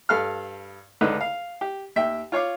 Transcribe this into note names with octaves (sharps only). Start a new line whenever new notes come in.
G2 A4 F5 F6
C#2 D3 D#4 B4
F5
G4
D#2 E5 G5
F4 C#5 F5 D6